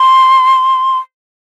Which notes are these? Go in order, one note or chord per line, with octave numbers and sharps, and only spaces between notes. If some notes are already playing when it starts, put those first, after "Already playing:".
Already playing: C6